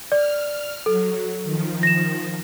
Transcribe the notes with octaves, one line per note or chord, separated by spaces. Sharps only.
D5 F6
F#3 A4
D#3 F3
A#6 E7